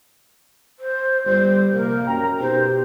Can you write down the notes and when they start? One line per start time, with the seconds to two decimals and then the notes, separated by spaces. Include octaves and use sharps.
0.79 C5
1.25 G1 G3 C5
1.73 A#1 C3 A#3 A#4
2.06 F#2 G5 A#5
2.40 B2 D#4 G4 C5